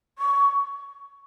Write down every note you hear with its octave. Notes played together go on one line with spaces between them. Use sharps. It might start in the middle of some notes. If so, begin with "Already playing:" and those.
C#6